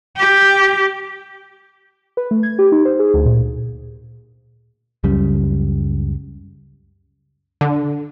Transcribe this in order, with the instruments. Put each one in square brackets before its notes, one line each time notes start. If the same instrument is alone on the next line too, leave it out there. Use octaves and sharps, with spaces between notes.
[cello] G4
[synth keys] B4
A3
G#6
G4
D#4
C5
G#4
D2
A#2
[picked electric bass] C#2 F#2 C#3 G3
[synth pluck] D3